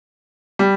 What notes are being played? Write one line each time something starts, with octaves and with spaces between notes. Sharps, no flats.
G3